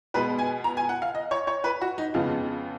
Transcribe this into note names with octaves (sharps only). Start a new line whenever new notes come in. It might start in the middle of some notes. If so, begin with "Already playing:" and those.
B2 G#3 B3 B4
G#5
A#5
G#5
F#5
F5
D#5
C#5
C#5
B4
F#4
D#4
F2 C#3 G#3 B3 F4